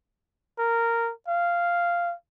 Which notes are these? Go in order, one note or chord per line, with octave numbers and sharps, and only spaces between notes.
A#4
F5